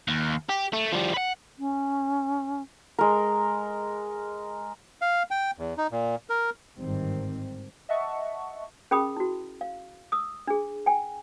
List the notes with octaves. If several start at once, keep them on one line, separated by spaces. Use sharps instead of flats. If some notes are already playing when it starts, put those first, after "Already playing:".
D#2
G4
A3
F3 G3
B4 F#5
C#4
G#3 A#4
F5
G5
E2
D#4
A#2
A#4
G1 G#2 D#3 G3 C4
D#5 E5 F#5 A5 C#6
C#4 G#4 A#4 G5 B5 D#6
E4 F#4
F5
D#6 E6
D4 G#4
G5 G#5